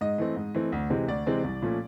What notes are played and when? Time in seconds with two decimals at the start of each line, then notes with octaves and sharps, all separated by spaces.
0.01 G#2 D#5
0.18 E3 A3 C4
0.36 G#2
0.55 E3 A3 C4
0.72 D2
0.90 C3 E3 G#3 C4
1.08 D2 D5
1.26 C3 E3 G#3 C4
1.44 C2
1.62 A#2 F3 A3 C#4